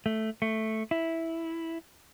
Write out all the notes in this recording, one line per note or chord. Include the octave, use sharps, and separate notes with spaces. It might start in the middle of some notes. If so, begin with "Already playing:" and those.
A3
A3
E4